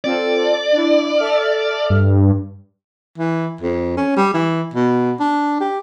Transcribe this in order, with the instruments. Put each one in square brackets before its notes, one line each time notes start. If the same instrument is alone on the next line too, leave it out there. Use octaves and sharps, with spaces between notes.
[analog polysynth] C4 F4 A4 [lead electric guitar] D5
[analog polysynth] D4 E4
A4 E5 F6
[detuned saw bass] G2
[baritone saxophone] E3
F2
C#4
G3
E3
B2
D4
G4